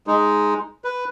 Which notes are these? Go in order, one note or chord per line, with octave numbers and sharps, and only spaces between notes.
G#3 D#4
B4